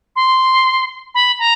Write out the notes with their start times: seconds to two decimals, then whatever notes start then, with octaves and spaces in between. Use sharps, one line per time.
0.16 C6
1.15 B5
1.39 A#5